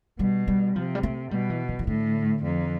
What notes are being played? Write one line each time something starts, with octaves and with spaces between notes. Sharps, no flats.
B2 G3
G3
C3 F3
G3
A3
B2 G3
E3
E3
E3
A2 D3
F2